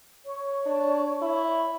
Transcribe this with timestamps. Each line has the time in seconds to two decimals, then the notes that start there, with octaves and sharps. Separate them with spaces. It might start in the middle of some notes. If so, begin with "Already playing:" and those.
0.25 C#5 C#6
0.66 D4
1.22 E4